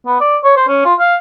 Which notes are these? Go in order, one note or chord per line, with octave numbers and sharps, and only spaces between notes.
B3
D5
C#5
C5
C#4
F4
F5